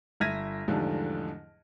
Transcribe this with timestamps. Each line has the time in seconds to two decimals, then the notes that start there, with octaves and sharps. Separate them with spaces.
0.20 G1 E5 F6 G#6 A#6 D#7
0.68 E2 G#2 D3 F3 G3 A3